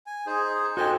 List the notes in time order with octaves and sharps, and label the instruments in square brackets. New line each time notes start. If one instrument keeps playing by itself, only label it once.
[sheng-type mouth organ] G#5
[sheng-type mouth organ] D#4 [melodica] G#4 C5
[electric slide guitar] F#4 A4 G5 [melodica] C5 [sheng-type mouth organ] D#5 G#5